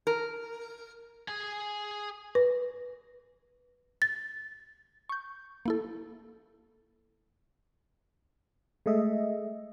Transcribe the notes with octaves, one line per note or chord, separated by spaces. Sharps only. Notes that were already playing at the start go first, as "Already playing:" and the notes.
A#4
G#4 G#5
B4
A6
C#6 G6
A#3 E4 A4
G#3 A3 D#5 E5